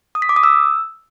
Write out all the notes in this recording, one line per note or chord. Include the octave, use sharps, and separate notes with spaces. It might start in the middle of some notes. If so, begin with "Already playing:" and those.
D#6
B6
D6
D#6
E6